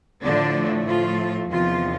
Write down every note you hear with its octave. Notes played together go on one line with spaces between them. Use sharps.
A2 D3 F3 A3 D4
F3 F4
E2 C3 D#3 F3 F4